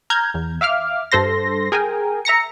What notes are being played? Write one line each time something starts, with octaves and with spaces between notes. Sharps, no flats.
A#5 F6 G6 G#6
E2
E5 F5 D6 F6
G2 A4 C5 C6 A#6
G#4 A#4 G5 G#5
E5 A#5 A#6 C#7